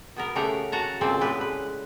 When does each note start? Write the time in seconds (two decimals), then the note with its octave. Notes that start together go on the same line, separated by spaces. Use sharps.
0.16 B2 B3 A#4
0.35 C#3 A3 G4 A#4 F#5 A#5
0.72 F#4 A5 A#5
1.01 A#2 C#3 A3 C4 D5
1.21 A2 G#3 G4 B4
1.41 B4